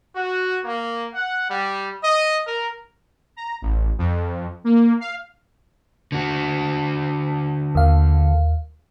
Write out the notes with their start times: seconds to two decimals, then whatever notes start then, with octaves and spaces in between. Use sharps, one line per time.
0.16 F#4
0.64 A#3
1.15 F#5
1.51 G3
2.04 D#5
2.47 A#4
3.36 A#5
3.62 A1
3.98 F2
4.64 A#3
5.00 F5
6.12 D3 F#4
7.75 D#2 F5